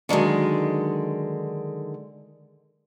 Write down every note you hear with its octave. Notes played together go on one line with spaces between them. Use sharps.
D3 D#3 F#3 G#3